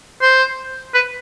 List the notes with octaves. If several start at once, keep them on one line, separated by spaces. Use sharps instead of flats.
C5
B4